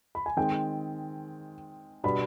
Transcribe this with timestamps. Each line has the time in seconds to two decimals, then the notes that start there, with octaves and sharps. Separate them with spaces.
0.15 B5
0.26 G#5
0.37 D#3 G#3 C4 G5
2.03 B2 G3 B3 D4 B5